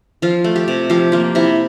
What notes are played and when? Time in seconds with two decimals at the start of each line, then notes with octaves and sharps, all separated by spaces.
0.22 F3 F4
0.44 A3
0.56 G4
0.68 C3
0.90 F3 G4
1.12 A#3 F4
1.35 C3 E4